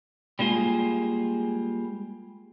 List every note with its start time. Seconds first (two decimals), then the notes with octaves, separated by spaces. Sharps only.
0.39 G3 G#3 A#3 F4 G#4